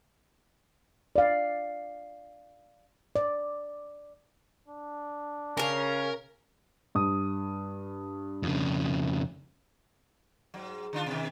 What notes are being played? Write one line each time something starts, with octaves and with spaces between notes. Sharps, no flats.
D5 F5
D5
D4
C#3 C#4 A#4 F5
G2 D#6
F2 C#3
G#2 F#3
D3 D4 F4
B2 D#3